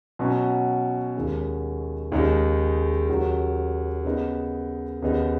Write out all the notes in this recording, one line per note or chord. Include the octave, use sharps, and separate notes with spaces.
B2 F#3 C#4
D#2 D#3 G#3 C#4
D#2 C#3 G#3 D#4
D#2 C#3 F#3
C#3 B3 D#4
D#2 C#3 B3 D#4